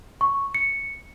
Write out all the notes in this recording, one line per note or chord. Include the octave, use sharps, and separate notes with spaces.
C#6
C#7